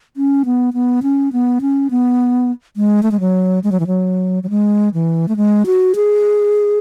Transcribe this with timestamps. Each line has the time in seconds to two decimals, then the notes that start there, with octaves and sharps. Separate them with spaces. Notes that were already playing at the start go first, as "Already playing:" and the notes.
0.17 C#4
0.45 B3
0.74 B3
1.03 C#4
1.33 B3
1.61 C#4
1.91 B3
2.77 G#3
3.03 A3
3.11 G#3
3.20 F#3
3.64 G#3
3.72 F#3
3.80 E3
3.87 F#3
4.43 F#3
4.50 G#3
4.94 E3
5.28 A3
5.37 G#3
5.66 F#4
5.96 G#4